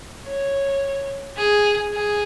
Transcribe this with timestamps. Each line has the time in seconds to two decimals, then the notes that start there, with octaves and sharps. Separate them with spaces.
0.25 C#5
1.37 G#4
1.93 G#4